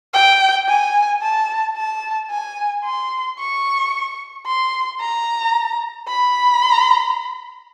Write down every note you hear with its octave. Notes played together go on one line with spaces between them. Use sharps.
G5
G#5
A5
A5
G#5
C6
C#6
C6
A#5
B5